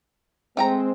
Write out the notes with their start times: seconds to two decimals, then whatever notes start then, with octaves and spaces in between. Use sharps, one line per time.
0.57 G#3 A3 C4 G5 A#5